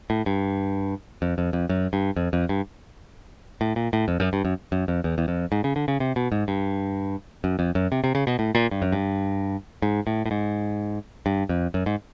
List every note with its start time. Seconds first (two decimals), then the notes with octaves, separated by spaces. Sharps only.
0.10 A2
0.26 G2
1.22 F2
1.38 F2
1.53 F2
1.69 F#2
1.93 G2
2.16 F2
2.33 F2
2.49 G2
3.61 A2
3.76 A#2
3.93 A2
4.08 F2
4.20 F#2
4.33 G2
4.45 F#2
4.72 F#2
4.88 F2
5.04 E2
5.18 E2
5.28 F2
5.52 G#2
5.64 C#3
5.76 D3
5.88 C#3
6.00 C3
6.16 B2
6.32 G#2
6.48 G2
7.44 F#2
7.59 F2
7.75 F#2
7.92 C3
8.04 C3
8.15 C#3
8.27 B2
8.39 A2
8.55 A#2
8.71 G2
8.82 F#2
8.92 G2
9.82 G#2
10.07 A2
10.26 A2
10.31 G#2
11.26 G2
11.49 F2
11.74 F#2
11.86 G#2